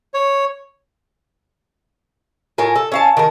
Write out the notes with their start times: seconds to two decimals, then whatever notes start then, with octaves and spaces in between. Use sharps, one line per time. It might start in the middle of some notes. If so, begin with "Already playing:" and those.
0.14 C#5
2.58 A2 F4 A#4 G#5
2.76 A4
2.92 C#4 F5 A5
3.17 D#3 A#4